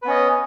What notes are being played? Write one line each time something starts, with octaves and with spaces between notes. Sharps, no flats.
B3 C#4 B4 D#5